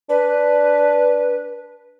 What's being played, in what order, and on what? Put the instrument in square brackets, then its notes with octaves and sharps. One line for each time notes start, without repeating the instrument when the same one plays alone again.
[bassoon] D4 [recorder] B4